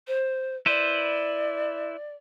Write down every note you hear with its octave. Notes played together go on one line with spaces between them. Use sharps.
C5
E4 B4 C5 D5